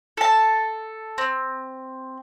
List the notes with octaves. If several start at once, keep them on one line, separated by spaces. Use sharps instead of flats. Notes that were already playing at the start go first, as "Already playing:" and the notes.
A4 A5
C4